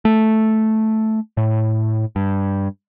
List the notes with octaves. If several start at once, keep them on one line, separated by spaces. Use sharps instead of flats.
A3
A2
G2